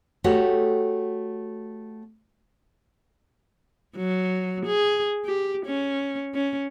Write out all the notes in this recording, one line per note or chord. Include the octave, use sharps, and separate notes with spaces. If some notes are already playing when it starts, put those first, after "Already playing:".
A3 F#4 G4 C#5
F#3
G#4
G4
C#4
C#4